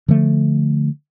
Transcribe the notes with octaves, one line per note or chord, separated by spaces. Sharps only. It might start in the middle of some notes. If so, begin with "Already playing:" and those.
D3 F3 A3